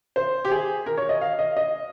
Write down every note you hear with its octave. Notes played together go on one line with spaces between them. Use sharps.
C5
G4
G#4
A#4
C#5
D#5
F5
D#5
D#5